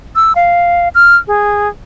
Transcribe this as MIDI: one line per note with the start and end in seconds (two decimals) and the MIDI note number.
0.16 0.33 88
0.36 0.89 77
0.95 1.16 89
1.27 1.68 68